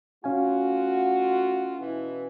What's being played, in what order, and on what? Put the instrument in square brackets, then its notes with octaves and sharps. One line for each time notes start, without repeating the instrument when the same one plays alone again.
[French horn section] A3 F4 F#4 [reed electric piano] C#4 F5 G#5
[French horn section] B2 E3 E4